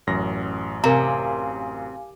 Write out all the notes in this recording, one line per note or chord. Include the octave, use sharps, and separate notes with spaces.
A1 F#2 A#6
C3 A#4 F5 G#5 A#5